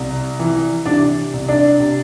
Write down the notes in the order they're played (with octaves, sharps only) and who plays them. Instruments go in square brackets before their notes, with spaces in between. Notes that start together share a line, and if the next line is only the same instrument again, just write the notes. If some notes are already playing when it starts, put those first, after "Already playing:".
Already playing: [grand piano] C2
E3
C3 D4 D5
C2
D4 D5
C3